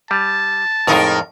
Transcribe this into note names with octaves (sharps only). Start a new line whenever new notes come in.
G3 A5
F2 A2 G#3 D#4 A#4